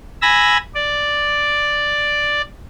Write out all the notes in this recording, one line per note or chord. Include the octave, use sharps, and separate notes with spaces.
G#5 B5 E6 A#6
D5